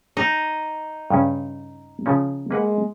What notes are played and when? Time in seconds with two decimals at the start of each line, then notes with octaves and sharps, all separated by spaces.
0.17 D#4
1.10 G2 C#3 C#4
2.06 C#3 F3 C#4
2.51 G#3 A#3 B4 F#5